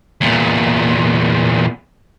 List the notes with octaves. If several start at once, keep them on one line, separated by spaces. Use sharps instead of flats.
E2 A#2